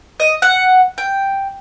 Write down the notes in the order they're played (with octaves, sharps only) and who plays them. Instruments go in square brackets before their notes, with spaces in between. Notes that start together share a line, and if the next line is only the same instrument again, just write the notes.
[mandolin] D#5
F#5
G5